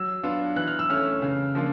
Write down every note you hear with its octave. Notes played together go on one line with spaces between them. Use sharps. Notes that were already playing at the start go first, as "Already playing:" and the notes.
Already playing: F#3 E6
B3 D4 F4
E3 F#6
F6
E6
A3 C#4 F6
C#3
F3 A#3 D4 F4